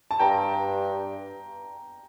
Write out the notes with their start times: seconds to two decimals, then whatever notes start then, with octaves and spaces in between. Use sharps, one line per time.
0.11 A5
0.19 G2 G5 A#5